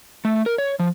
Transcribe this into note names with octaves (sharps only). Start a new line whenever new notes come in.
A3
A#4
C#5
F3